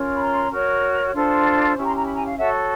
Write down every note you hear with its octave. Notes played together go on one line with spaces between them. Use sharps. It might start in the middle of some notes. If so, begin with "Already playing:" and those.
Already playing: C#4 F4 A#4 C#5
B5
A#5 C6
F#4 A#4 C#5
D4 F4 A4 C5
C#4 E4 G4 C#6
A#5 C6
A#5
B5
G#5 A#5
F5
F#4 A4 C#5 E5 F#5